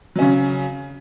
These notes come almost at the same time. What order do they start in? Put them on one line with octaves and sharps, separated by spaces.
F#3 C#4 C#3